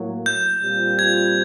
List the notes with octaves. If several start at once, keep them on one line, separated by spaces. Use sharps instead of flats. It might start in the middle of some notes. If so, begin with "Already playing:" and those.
Already playing: A2 F#3 A#3
G6
A#2 G3 C4 F4
G#6